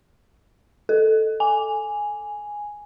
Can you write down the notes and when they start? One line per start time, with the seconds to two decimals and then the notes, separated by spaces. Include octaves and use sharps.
0.89 A4
1.40 G#5